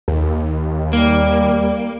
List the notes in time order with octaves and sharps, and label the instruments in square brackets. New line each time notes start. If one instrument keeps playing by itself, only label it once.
[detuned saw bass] D#2
[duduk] G3 [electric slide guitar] A#3